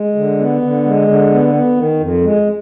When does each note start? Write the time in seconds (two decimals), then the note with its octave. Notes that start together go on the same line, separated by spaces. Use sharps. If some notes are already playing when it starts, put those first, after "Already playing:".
Already playing: G#3
0.15 D3
0.39 B3
0.62 D3
0.85 G#3
1.08 D3
1.31 B3
1.54 B3
1.77 D#3
2.00 F2
2.23 G#3